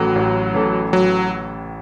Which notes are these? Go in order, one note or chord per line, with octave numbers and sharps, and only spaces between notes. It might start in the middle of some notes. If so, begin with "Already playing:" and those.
Already playing: A1 A2 E3 F#3 C#4 A4
A1
A2 E3 C#4 A4
A1 F#3